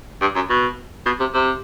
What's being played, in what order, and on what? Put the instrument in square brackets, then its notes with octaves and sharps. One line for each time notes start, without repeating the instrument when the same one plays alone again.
[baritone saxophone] G2
F#2
B2
B2
C3
C3